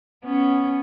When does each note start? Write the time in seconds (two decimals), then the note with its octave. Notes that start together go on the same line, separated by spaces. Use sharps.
0.24 B3 C#4